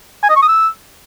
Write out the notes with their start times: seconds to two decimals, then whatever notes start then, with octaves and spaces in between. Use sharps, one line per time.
0.23 G#5
0.30 D#5
0.36 C#6
0.42 D#6
0.49 E6